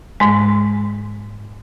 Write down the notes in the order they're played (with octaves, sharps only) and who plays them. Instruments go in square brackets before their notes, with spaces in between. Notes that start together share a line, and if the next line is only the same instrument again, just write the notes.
[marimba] G#2 G#3